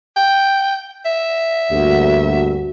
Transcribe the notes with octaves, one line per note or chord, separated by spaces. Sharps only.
G5
E5
D2 G2 A#3 F#4